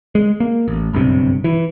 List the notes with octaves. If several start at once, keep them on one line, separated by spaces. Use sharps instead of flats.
G#3
A#3
A1
F#1 B1 G2 C3
E3